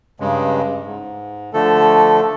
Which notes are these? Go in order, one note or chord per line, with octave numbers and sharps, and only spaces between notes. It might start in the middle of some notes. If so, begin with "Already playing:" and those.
G2 C#3 G#3
G#2
D3 F3 A3 A4